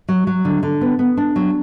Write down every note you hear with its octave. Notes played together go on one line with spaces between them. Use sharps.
F#3
F#3
D3
D3
B3
B3
D4
F#3